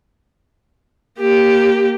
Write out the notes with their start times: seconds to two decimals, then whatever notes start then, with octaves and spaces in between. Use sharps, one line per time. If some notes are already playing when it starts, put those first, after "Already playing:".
1.20 A#3 G4